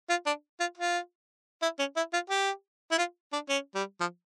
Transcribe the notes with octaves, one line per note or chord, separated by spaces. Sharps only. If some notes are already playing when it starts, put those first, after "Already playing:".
F4
D4
F4
F4
E4
C#4
E4
F4
G4
E4
F4
D4
C#4
G3
F3